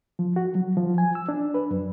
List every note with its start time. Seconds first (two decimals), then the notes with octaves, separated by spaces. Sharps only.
0.19 F3
0.36 F#4
0.55 F#3
0.77 F3
0.98 G#5
1.15 E6
1.29 D4
1.54 B4
1.71 F#2